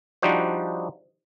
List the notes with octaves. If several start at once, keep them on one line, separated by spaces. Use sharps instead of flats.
F3 G3 D4 D#4 F#4 C5